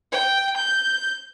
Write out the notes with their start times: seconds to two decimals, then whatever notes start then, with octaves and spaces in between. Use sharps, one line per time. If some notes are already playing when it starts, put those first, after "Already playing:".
0.12 G5
0.57 G6